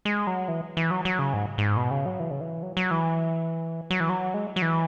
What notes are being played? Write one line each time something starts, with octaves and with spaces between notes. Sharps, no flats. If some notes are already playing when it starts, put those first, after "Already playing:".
G#3
F#3
E3
E3
F#3
F#3
C#3
G#2
G#2
B2
C#3
F#3
E3
C#3
E3
F#3
F#3
E3
F#3
E3
F#3
G#3
F#3
E3